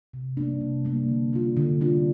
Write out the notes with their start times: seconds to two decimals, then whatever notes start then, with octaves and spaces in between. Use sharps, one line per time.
0.14 C3
0.37 G3 A#3 D4
0.61 C3
0.85 G3 A#3 D4
1.09 D3
1.33 G3 D4 F4
1.57 D3
1.81 G3 D4 F4